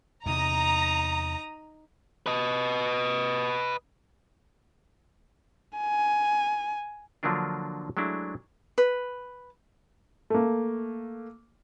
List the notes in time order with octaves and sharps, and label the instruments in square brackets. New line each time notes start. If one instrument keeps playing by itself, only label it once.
[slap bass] E2 C3 [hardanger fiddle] D#4 D#6 [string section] A#5
[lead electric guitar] B4 D#5
[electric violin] G#5
[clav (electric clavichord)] D3 F3 F#3 A#3 D4 F4
F#3 G#3 A3 D4 E4
[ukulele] B4
[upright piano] A3 A#3